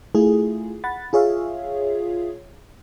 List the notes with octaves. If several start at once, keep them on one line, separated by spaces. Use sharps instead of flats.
A3 E4 F4 G#4
F#5 B5 A6
F4 G#4 C#5 E5 F5